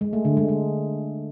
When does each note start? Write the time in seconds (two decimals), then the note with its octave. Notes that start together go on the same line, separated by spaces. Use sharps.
0.01 G#3
0.13 A3
0.25 D3
0.37 G#3
0.49 G#3